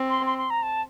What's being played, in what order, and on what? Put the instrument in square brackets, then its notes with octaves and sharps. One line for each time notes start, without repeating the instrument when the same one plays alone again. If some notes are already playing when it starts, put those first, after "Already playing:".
Already playing: [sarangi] C4
[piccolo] C6
C6
C6
A#5
A5